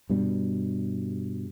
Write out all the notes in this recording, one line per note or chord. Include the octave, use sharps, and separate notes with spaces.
G2 B2 G3